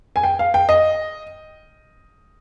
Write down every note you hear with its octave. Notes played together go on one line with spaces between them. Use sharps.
G#5
G5
F5
G5
D#5